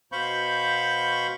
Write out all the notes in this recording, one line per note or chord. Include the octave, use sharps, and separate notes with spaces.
B2 C5 F5 B5 C#6 G6